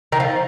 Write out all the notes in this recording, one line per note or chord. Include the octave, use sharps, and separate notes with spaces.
D#3
F3